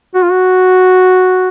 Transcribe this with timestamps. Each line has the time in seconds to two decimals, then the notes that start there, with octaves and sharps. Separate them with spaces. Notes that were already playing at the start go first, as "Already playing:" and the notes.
0.15 F#4
0.23 F4
0.31 F#4